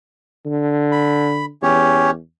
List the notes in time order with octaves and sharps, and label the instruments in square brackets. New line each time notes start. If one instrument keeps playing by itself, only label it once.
[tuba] D3
[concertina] B5
[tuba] E2 [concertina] C#4 G4 C#5